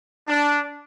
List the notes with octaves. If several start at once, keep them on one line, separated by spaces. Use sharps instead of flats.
D4